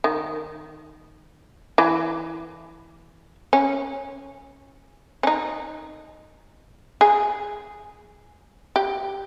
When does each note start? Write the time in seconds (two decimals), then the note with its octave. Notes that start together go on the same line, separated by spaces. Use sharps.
0.04 D#3
1.78 E3
3.53 C#4
5.23 C#4
5.27 D#4
7.01 G#4
8.76 G4